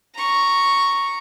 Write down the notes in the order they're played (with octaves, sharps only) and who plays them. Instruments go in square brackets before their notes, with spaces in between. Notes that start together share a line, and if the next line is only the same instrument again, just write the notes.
[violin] A#5 C#6